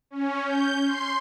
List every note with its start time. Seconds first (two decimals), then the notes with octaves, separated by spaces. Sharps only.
0.10 C#4
0.43 G6
0.85 C6